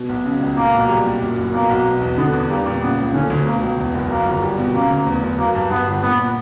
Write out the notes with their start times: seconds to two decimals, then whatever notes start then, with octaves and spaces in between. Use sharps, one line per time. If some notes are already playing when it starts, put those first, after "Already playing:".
Already playing: B2
0.09 B1
0.25 C#3
0.41 C#2
0.57 A#2 A#3
0.73 B1
0.89 G3
1.06 A#2
1.21 F#2
1.38 F#1
1.54 B2 A#3
1.69 B1
1.86 B2
2.01 E2
2.18 D3 B3
2.33 E2
2.50 G3 A#3
2.66 A#2
2.82 C#3 B3
2.98 C#2
3.14 D3 C#4
3.30 D2
3.46 B2 A#3
3.62 C#2
3.79 E2
3.95 F#1
4.10 F#2 A#3
4.26 G1
4.43 G3
4.59 B2
4.74 C#3 A#3
4.91 D2
5.06 E2
5.23 F#1
5.38 F#3 A#3
5.55 G2
5.70 G2 B3
5.87 G1
6.03 A#2 B3